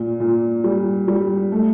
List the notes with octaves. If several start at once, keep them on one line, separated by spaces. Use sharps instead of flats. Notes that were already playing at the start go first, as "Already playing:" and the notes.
Already playing: A#2
A#2
G3
G3
A3